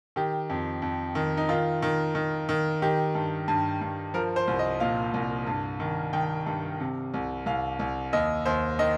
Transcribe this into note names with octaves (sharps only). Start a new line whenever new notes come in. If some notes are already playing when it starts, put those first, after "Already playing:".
D#3 G4
F2
F2
D#3
D#4
D#3 F4
D#3
D#3
D#3
D#3 G4
G2
G2
G2
F3 A#4
C5
C2
D#5
A#2 F5
C2
G2
D#3
D#3 G5
G2
C3
C2
C2 F5
C2
D#2 D#5
D#2 C5
D#3 D#5